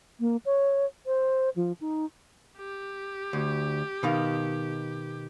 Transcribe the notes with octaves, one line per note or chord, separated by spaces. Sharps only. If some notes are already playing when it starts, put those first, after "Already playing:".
A#3
C#5
C5
F3
D#4
G4
D2
B2 D#3 F5